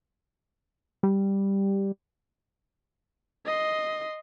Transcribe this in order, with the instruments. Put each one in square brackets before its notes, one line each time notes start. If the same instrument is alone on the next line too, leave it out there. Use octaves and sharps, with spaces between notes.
[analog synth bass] G3
[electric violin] D#5 C6